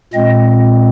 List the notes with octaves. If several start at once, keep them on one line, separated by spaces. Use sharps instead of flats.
A#2 G#3 C4 D#5